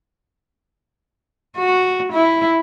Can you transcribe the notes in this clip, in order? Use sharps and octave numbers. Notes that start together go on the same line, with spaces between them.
F#4
E4